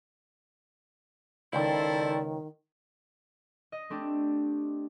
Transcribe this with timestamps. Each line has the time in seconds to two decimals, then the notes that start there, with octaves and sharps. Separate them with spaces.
1.53 C#2 D#3 E4 A4 C5 D5 G5
3.72 D#5
3.90 A3 C4 D4 G4